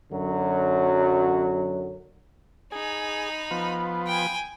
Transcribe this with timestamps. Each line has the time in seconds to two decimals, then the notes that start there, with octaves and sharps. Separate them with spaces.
0.12 F#2 D3 F#3
2.72 D#4 G#4 B5
3.51 F3 B3
4.07 G5 G#5